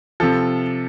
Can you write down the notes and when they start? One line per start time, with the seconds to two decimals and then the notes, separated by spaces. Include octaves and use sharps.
0.20 C3 F3 A4